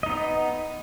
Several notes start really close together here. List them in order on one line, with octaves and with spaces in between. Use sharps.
D#5 D#4 B3